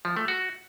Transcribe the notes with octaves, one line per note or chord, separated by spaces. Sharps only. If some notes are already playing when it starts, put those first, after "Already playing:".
F3
A3
F#4